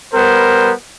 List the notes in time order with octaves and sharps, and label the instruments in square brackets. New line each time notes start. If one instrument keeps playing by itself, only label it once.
[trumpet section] G3 B3 A#4 C5